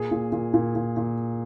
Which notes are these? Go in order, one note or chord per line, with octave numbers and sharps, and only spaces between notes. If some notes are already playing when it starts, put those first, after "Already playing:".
Already playing: A#2 G#4
A#2
A#2
A#2
A#2
A#2